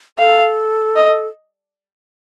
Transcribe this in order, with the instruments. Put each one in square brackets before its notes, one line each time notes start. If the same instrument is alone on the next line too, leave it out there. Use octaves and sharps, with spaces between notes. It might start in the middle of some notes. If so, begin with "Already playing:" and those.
[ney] A4 [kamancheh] F5
[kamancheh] D#5